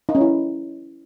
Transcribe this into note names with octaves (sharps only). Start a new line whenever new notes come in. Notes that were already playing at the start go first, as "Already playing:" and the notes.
D#4
C#4
E4